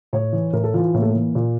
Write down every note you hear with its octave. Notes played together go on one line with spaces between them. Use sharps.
A2 C#5
E3
A2 A#4
A4
E3 F4
F4
A2 A#3
A3
A#3
E3
A#2